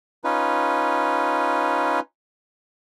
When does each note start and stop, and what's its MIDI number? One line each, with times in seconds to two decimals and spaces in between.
0.24 2.00 61
0.24 2.00 63
0.24 2.00 65
0.24 2.00 71